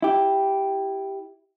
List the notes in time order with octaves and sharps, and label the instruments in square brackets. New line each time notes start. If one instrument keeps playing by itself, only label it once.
[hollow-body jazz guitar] E4 G4